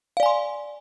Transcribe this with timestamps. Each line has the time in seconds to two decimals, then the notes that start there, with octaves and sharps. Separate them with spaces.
0.17 F5
0.20 D5
0.23 G#5
0.26 C6